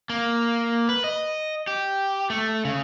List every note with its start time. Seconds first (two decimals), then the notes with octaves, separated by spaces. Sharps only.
0.09 A#3
0.89 B4
1.04 D#5
1.67 G4
2.30 A3
2.65 C#3